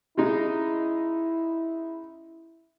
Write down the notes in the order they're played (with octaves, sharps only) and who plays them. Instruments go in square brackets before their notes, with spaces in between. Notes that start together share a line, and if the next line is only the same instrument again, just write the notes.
[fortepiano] C#3 G#3 D#4 [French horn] E4